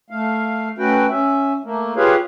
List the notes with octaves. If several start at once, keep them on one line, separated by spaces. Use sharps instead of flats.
A3 F5
A3 C#4 F#4 B4 G5
C#4 E5
A3 A#3
F4 G4 G#4 B4 C#5 F5